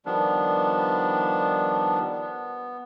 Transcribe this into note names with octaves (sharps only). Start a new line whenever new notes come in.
D#3 F3 G3 B3 D4
B3